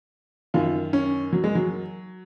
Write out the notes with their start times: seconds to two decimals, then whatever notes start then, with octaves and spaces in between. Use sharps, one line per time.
0.54 F#2 D#3 F4
0.93 C#4
1.33 F#3
1.44 G#3
1.55 F#3